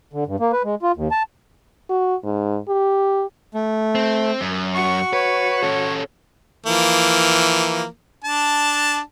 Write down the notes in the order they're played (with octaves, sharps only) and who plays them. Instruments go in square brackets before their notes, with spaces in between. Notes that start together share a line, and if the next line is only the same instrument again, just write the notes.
[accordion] D3
G2
A#3
B4
G#3
F4
D#2
A5
[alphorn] F#4
G#2
G4
[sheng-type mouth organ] A3
[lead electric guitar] C4
F#2
[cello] F#4 [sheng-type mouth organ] C#6
[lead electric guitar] B4 [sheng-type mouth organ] C#5
[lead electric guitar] C#4 A4
[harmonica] E3 F3 A#3
D4 A5